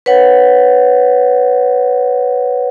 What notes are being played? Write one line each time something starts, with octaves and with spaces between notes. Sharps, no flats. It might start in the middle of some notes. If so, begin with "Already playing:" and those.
B4 C#5 F#5